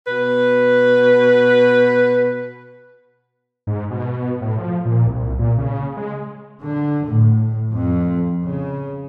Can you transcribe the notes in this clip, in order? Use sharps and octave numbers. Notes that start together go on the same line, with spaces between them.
B2 B4
G#2
B2
A2
F3
A#2
C2
A#2
C#3
G#3
D3
A2
F2
C#3